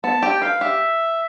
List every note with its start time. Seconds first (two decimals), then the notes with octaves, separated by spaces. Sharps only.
0.04 B3 A5
0.22 G4 G5
0.42 B4 F5
0.61 G4 E5